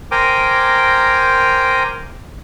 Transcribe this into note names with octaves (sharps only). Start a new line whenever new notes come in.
A#4 C5 G5 G#5 A#5 D6